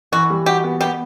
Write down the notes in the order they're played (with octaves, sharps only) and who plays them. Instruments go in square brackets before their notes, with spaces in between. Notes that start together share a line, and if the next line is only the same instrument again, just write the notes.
[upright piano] E3 [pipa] F#4
[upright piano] G3
[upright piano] F#4 [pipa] G4
[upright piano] B3
[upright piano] B3 [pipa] G4